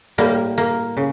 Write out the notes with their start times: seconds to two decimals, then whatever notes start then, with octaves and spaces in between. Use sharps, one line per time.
0.18 A2 G3 A#3
0.58 A#3
0.97 C#3